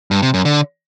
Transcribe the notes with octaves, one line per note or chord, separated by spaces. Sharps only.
G2
C3
F#2
D3